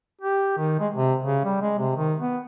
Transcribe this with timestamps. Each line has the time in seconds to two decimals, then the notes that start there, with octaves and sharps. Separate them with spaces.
0.21 G4
0.58 D#3
0.79 G#3
0.94 C3
1.24 C#3
1.44 G3
1.61 G#3
1.78 C3
1.97 D#3
2.20 B3